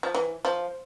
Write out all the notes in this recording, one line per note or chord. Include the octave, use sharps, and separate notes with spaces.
F3
E3
F3